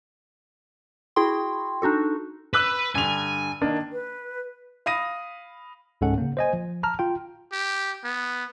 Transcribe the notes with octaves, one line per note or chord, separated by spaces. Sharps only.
E4 F#4 G#4 G5 C6
D4 D#4 F#4 A4
B4 E6 F#6 F#7
G2 D3 G#5 F7
D#3 A#3 D4
B4
F5 B5 D#6 A#6 D#7
C#2 G#2 G#3 C#4 A4 F#5
C#3 A#3
C5 D#5 G#5
F3
A5 A#5 F6
F4 G5
G4
B3